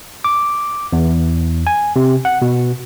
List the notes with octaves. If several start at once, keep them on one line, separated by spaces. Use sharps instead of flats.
D6
E2
G#5
C3
F#5
B2